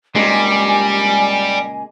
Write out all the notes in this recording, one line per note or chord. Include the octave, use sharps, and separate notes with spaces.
C#2 A#2 G3 G#3 G#5